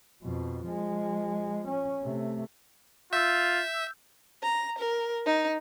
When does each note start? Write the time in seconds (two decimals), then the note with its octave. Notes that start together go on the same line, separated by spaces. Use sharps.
0.23 F2 B2
0.66 F3 G#3
1.67 C#4
2.02 C3 A3
3.13 F4 E5 E6 G6
4.43 A#5
4.78 A#4
5.26 D#4